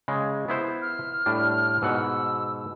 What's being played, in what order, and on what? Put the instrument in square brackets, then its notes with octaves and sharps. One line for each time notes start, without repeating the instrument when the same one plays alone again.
[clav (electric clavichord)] C#3 G#3
B3 E4 C5
[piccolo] F6
[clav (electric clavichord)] A2 G3 D4
[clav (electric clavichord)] G#2 B2 F#5 [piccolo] E6